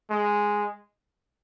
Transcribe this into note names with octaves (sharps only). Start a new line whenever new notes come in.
G#3